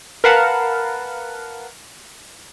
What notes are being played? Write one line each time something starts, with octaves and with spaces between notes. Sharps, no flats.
A#4 B4 F5 F#5 A5